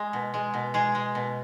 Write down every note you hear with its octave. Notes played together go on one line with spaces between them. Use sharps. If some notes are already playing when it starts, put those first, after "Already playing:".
Already playing: G#3
B2
G#3
B2
G#3 G#4
G#3
B2